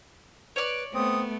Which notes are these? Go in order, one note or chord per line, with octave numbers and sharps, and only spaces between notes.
B4 C#5 D5
A3 B3 C4 D#6